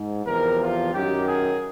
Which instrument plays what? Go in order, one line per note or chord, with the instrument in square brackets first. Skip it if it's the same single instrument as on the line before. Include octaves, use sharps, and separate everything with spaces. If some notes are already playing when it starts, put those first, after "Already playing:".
Already playing: [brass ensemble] G#2
E2 C3 F3 A#4
F4
F#2 D#3 F#3 G4
G#4